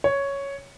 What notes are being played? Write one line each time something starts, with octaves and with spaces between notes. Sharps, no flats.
C#5